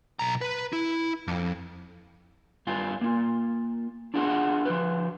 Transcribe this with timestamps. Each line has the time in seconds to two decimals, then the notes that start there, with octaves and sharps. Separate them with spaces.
0.19 B1 A#5
0.41 B4
0.73 E4
1.28 F2
2.67 G2 F4 G#5
3.01 A#3 F4
4.14 D4 F4 F#4 G#4 F#5
4.65 F3 F#4 B4